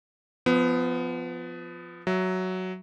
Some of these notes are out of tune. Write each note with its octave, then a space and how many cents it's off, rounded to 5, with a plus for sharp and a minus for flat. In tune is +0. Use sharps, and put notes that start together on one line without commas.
F3 +0 B3 +25
F#3 +5 E5 +5